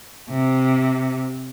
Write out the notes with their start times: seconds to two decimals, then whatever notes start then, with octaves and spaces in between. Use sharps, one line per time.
0.30 C3